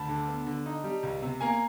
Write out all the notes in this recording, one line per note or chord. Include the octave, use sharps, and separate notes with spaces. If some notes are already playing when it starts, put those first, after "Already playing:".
Already playing: D2 A5 B5
D3
B3
D3
D#4
G3
C#2
C3
A#3 G#5 A#5